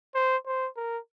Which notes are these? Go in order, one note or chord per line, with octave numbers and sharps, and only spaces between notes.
C5
C5
A#4